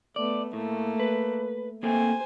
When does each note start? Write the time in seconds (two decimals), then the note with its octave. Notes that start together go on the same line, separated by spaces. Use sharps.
0.16 A3 B3 D5
0.53 A2 A3 A#3
1.00 B4
1.83 A#3 C4 A4 C5 G#5